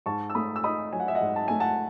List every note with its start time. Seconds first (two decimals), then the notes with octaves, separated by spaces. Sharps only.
0.06 G#2 A5 C#6
0.30 E6
0.35 A3 B5 D#6
0.56 E6
0.64 D#4 B5 D#6
0.93 F#3 G#5
1.00 F#5
1.08 E5
1.15 D#5 F#5
1.21 G#2
1.36 A5
1.48 A3 G#5
1.60 F#5 A5